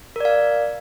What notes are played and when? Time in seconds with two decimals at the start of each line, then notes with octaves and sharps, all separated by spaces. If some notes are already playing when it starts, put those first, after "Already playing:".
0.16 A#4
0.20 D5
0.25 F5